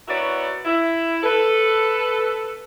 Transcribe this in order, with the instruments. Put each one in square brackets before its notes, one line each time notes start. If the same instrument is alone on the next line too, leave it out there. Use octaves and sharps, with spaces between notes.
[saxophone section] B3 E4 F#4 A#4 C#5 D5
E4
A4 B4